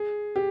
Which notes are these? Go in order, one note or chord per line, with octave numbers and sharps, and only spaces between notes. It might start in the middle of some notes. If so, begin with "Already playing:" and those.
Already playing: G#4
G4